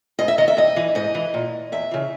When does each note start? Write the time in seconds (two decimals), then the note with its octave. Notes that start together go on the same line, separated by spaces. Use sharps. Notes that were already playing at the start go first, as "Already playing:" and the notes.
0.19 G#2 D#5
0.28 E5
0.38 D#3 D#5
0.48 E5
0.57 G2 D#5
0.76 E3
0.95 G#2 D#5
1.15 E3
1.34 A#2
1.72 E2 E5
1.91 C#3 E3